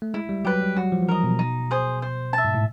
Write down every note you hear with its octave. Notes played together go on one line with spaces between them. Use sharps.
A3
G#3 E4
G3
F#3 G4 B4
G3
F#3 F#4
F3
F3
E3 A#4 D#5
B2
D#4
G#4 C5
C5
E5 A5
G#2
A2